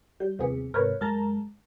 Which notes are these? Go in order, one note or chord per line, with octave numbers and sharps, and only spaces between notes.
G3 G6
D#2 C3 F3 B3 G#4
G#2 C3 A#4 B4 C#5
F#2 G#3 A#4 A5 A#5